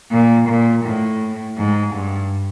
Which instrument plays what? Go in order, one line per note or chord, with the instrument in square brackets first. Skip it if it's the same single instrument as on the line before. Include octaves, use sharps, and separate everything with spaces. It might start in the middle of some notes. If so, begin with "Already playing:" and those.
[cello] A#2
A#2
A2
G#2
G2